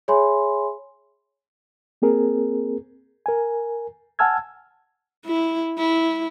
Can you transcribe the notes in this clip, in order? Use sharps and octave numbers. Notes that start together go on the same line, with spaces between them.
G#4 C#5 E5 G#5 B5 C6
A#3 C4 G#4 A#4
A#4 G#5
F#5 G#5 A5 E6 F6 G#6
E4
E4